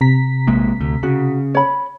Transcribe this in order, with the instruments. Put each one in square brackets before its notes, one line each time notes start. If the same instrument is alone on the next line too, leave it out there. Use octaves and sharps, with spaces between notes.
[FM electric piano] C3 A#5 B6
[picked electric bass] A#1 G#3 A#3
D2
[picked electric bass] C#3 [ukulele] F#4
[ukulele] C#5 B5